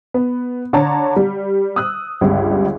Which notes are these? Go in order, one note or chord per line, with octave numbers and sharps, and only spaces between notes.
B3
D3 C#5 A5 A#5
G3
D#6 E6 F#6
G1 C#2 G3